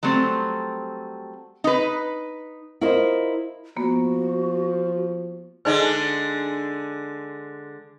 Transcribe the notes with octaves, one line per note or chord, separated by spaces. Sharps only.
F#3 G3 A3 C4
D#4 B4
E4 F4 A#4 C5 D#5
F3 A#3 B3 F#4
D3 G#3 D4 D#4 B4